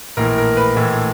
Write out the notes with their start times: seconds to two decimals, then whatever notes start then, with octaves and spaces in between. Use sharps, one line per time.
0.17 A#1 A2 E3 A#4
0.38 A#4
0.57 B4
0.76 A#1 A2 E3